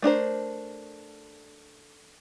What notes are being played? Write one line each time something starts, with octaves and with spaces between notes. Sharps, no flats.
A3 D4 A#4 C5